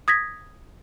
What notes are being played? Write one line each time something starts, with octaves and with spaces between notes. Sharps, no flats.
D#6 G#6 A#6 B6